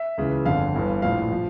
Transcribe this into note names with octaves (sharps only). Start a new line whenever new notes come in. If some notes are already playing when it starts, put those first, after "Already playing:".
Already playing: E5
C#2 C#3 E3
G1 F2 D3 F5
G1 G2 E3
A#1 A2 F3 F5
F3